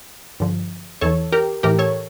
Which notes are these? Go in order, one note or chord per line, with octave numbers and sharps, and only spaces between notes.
G2 D3 F3
E2 E3 A4 C#5
G4 A#4
A2 E3 G4 A#4
A4 C#5